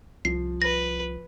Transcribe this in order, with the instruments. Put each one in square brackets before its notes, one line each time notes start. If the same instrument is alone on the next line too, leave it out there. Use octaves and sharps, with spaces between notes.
[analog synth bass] C2 [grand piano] F3 [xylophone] C7
[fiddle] B4 [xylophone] A#6